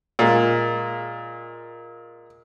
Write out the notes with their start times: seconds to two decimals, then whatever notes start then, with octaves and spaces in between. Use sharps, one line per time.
0.19 A#2 G#3